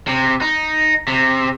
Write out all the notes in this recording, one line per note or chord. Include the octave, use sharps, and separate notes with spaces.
C3
D#4
C3